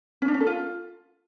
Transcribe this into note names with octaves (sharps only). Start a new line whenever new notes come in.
C#4
D4
C#4
A4
F4